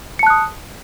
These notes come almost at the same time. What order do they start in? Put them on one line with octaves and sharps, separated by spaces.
C#7 A5 F#6 D#6